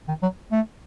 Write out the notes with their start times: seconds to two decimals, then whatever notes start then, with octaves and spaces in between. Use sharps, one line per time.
0.08 D#3
0.23 F#3
0.52 A3